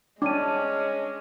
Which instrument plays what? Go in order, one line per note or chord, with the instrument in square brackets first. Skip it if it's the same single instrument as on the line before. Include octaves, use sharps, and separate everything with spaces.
[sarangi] G#3 [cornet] C#4 [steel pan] D4 [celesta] D6 D#7